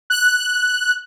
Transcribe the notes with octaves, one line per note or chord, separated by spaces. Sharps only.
F#6